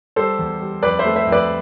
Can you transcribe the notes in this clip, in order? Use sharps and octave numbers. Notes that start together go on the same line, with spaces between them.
G3 A4 C5
E2
G3
F2 B4 D5
C5 E5
A3
C5 E5
F2
B4 D5